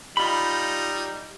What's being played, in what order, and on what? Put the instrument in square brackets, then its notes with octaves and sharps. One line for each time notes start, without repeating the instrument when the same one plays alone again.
[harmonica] G3 D#4 [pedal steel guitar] F4 B5